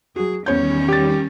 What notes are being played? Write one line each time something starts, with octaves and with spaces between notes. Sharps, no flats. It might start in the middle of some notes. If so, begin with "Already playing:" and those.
F#3 F#4 G#4
E2 D#3 G3 C#4 C#5 G6
G4 A6